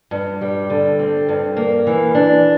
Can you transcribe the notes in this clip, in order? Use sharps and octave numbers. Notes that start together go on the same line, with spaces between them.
G2
G3
D3
C4
G2
A#3
E3
D4